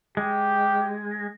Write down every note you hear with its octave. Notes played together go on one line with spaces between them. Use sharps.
G#3 G4